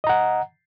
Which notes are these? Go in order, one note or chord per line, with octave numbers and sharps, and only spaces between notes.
D#5 F#5 A#5